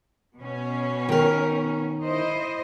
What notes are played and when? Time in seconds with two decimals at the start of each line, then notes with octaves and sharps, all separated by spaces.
0.39 B2 C#4
1.09 D#3 A#4
2.03 E4 C5 D#5